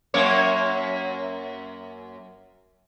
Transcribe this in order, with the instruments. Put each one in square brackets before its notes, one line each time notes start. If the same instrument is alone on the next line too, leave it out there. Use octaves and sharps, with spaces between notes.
[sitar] F#2 A#3 C#5